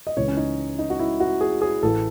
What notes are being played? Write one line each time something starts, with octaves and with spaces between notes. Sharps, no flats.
D#5
C#2 C#3 E3 C#5
C#4
D#4
D#4
F#4
E4
F#4
G#4
G#4
A1 A2 E3 A4